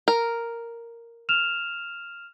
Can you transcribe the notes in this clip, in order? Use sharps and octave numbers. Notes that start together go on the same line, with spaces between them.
A#4
F6 E7 F7